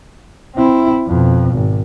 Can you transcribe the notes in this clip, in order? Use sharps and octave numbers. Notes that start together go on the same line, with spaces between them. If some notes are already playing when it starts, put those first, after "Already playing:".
C4 E4
F2 B2
G#1